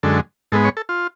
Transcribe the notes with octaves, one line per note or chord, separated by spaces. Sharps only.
F#2 D3 G#3 A4
G#2 G#3 B3 A4
C#5
A4
F4